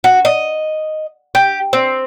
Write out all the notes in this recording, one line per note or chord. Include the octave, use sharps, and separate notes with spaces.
F#4
D#5
G4
C4